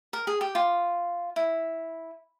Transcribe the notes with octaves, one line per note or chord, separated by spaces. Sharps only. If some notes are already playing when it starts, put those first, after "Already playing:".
A#4
G#4
G4
F4
E4